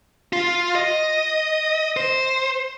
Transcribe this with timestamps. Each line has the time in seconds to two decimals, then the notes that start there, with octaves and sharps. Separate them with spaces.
0.33 F4
0.75 D#5
1.97 C5